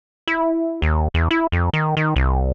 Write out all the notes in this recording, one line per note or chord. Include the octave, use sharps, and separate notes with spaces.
E4
D#2
E2
E4
F2
D#3
D#3
C2